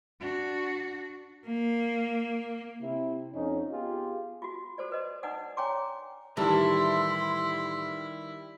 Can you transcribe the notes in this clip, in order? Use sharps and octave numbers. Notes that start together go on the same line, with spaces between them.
D4 F#4
A#3
C3 E4
F2 C#4 D#4
B3 F4 G4 G#4
F4 F#4
F#4 A4 C5 D5
B4 D#5
D4 D#4 B4 D5 F#5 D#6
C#5 G5 G#5 A#5 C6 D6
A2 D#3 E3 G3 E4 G4 C6